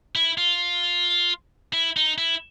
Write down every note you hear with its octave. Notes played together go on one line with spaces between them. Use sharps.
E4
F4
E4
D#4
E4